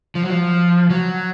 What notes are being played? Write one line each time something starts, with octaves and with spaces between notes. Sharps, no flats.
F3
F#3
F3
F#3